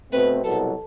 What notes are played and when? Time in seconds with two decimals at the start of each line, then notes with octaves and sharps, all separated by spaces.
0.12 B2 A3 C4 B4
0.43 C2 B2 F#3 A4